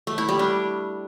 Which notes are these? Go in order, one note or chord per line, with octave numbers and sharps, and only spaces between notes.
A3
E4
G3
D4